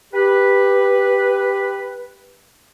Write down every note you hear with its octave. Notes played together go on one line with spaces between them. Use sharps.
G4 B4